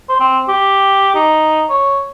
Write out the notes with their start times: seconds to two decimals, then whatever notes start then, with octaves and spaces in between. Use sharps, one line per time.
0.09 C5
0.20 C4
0.49 G4
1.15 D#4
1.70 C#5